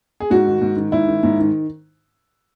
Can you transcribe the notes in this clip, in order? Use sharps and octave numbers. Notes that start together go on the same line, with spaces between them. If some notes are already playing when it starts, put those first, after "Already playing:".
G#4
G#2 F#4
D#3
G#2
D#3
G#2 E4
D#3
G#2
D#3